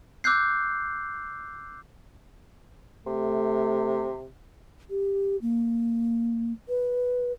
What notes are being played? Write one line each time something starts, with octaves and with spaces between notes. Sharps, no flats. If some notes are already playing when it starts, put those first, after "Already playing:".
D6 E6 F#6 G6 C7
C3 A3
G4
A#3
B4